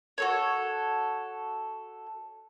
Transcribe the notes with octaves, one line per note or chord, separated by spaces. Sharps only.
F#4 A4 C#5